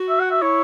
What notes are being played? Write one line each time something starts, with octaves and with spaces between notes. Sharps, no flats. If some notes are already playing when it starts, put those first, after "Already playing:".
Already playing: F#4
E5
F#5
E5
E4 C#5